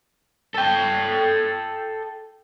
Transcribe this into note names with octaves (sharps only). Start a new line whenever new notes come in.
A4 G5